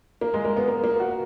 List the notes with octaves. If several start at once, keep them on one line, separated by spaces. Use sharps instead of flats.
A#3
G#3
A#3
B3
A#3
A#3
F#4